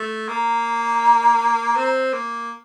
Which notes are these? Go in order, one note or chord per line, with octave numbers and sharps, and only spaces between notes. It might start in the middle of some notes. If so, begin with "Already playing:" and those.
Already playing: A3
A#3 A#5
C4
A#3